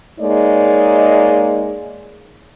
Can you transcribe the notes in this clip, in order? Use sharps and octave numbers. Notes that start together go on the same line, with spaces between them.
G#3 A#3 D#4 C#5 D5